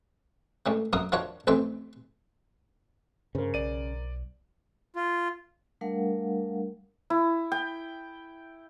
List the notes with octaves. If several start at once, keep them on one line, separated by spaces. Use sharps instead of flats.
C#2 A2 D#3
F#2 F#3 A#3 A#4 D#6
D#3 F3 D4 F4 F#4 C#5
A1 F2 E3 C5 G5
G2 C#3 A#4 C5
B1 D5 D#7
F4
G3 A3 D4 A#4 F5 F#5
E4
G5